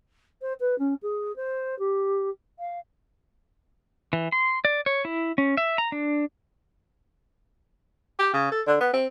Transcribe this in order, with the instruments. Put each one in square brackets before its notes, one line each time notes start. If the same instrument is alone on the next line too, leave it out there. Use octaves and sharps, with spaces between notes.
[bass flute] C5
B4
C#4
G#4
C5
G4
F5
[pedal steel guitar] E3
C6
D5
C#5
E4
C#4
E5
A#5
D4
[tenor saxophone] G4
C#3
A4
D3
B3
C4